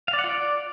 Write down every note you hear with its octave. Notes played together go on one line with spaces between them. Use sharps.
F5
D5
F#5
F4
D5